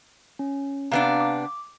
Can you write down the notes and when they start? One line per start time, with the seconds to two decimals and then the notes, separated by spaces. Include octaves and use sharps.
0.39 C#4
0.92 C3 B3 D4 F5 A#5
1.21 D6